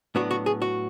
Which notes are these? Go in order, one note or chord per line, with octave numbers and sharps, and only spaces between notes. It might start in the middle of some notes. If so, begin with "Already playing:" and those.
A2 F#3 B3 D4 F#4
F#4
G#4
F#4